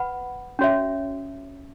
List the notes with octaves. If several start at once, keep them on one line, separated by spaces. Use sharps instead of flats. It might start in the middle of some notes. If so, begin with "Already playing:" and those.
Already playing: B4 F#5 B5
C#4 F#4 C#5 E5